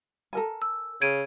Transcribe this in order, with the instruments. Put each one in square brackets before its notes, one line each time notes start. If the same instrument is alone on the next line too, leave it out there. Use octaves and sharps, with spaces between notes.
[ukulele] A4 A#4 G#5
[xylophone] E6
[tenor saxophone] C#3 [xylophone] G#6 D7 D#7